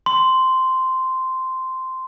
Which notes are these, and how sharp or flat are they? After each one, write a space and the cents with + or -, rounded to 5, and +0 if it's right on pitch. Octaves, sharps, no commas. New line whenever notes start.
C6 -10